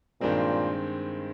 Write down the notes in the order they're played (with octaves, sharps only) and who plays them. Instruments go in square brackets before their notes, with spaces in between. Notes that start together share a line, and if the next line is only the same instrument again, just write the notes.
[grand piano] G2 D#3 G#3 C4 [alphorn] A#2